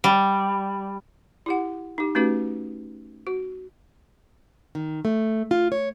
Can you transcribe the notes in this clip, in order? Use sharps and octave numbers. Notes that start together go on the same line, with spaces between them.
G3
E4 G4 F#5
D#4 G4
A3 C#4 D#4 F#4 G4 B4
F#4
D#3
A3
F4
C#5